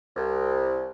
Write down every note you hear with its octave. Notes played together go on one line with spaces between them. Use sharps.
C2